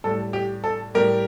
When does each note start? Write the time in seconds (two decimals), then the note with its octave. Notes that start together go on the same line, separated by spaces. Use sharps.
0.04 A2 G3 A4
0.33 G4
0.64 A4
0.95 A2 G3 G4 A#4